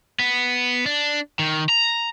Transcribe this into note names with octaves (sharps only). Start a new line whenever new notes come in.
B3
D4
D#3
A#5